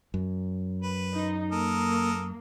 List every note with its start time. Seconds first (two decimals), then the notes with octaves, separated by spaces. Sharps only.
0.14 F#2
0.82 B4
1.13 D#4
1.52 A#3 A4 A#4 D#6